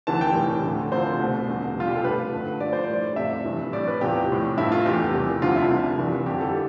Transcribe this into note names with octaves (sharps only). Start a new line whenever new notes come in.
D2 C3 E3 A5
G5
A2 E3 G3
D2 D3 A3
D2 C3 F3 C5
C2 B2 A3
E2 D3 G3
C2 B2 G3 F4
G4
A4
G2 F3 A3 B4
G2 D3 A3
G2 F3 A3 D5
C5
D5
A2 G3
F2 C3 F3 A3 E5
G2 E3 G3
A2 G3 D5
B4
E2 C3 F3 G4
A2 G3
G2 F3 A3 E4
F4
E2 C3 E3 A3 G4
E2 C3 G3
D2 D3 F3 A3 F4
E4
C2 C3 G3
G2 E3 G3
F2 D3 G3 G4
A4